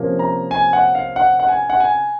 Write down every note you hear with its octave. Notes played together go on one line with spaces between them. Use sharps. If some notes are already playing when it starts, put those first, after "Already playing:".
Already playing: C3 F3 A#3 C#4
A#5
G#5
F#5
F5
F#5
F#5
G#5
F#5
G#5